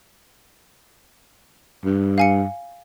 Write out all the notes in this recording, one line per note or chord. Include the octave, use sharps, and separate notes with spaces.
G2
F5 G#5 C#7